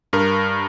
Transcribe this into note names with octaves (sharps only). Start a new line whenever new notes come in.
G2 A#4